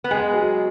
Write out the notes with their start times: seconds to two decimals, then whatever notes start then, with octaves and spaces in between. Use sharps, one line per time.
0.04 B3
0.11 G#3 G#4
0.34 F#3